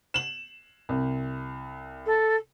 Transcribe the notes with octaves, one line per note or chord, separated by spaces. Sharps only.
E7 F#7
C2
A4